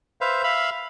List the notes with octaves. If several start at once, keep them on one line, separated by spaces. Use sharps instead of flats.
B4 C5 E5 F5
E5 F5 B5